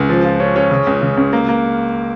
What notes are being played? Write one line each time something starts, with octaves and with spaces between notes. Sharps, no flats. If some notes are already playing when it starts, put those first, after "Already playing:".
Already playing: C#2
F3
F4
C#4
C#4
C#3
C#2
C#3
C#2
A#3
A#3